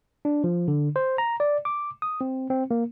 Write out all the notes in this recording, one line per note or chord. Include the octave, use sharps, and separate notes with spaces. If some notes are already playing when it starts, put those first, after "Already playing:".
D4
F3
D3
C5
A#5
D5
D6
D#6
C4
C4
A#3